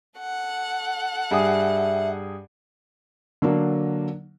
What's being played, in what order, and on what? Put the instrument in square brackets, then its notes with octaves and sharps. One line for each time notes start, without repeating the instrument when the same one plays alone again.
[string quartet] A4 F#5
[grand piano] G2 G#4 D#6 [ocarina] E5
[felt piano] D3 F#3 A#3 D4